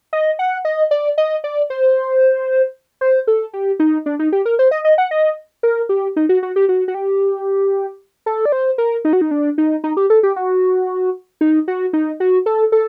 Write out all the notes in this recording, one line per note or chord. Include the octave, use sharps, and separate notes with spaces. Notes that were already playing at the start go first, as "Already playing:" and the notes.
D#5
F#5
D#5
D5
D#5
D5
C5
C5
A4
G4
D#4
D4
D#4
G4
A#4
C5
D#5
D#5
F#5
D#5
A#4
G4
D#4
F#4
F#4
G4
F#4
F#4
G4
A4
D5
C5
A#4
D#4
F#4
D#4
D4
D#4
D#4
G4
A4
G4
F#4
D#4
F#4
D#4
F#4
A4
A4